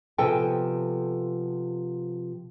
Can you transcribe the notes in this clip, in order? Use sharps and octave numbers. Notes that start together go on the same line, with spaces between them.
C3 F3 B3 A4 G5 G#5